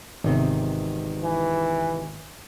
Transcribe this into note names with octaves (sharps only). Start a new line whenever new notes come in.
G#1 E2 C3 D#3
E3